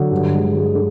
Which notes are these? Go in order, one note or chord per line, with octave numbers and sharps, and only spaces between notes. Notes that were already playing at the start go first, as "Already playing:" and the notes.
Already playing: D3 F#3
G2
G#3
G#3
D3